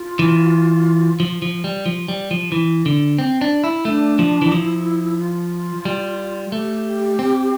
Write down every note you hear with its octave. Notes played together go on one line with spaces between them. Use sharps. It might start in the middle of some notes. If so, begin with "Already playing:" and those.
Already playing: F4
E3
F3
F3
G3
F3
G3
F3
E3
D3
C4
D4
E4
A3 D4
F3
E3
F3 E4
F4
G3
A3 G4
C4